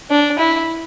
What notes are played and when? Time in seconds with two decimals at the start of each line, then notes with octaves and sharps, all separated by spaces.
0.11 D4
0.39 E4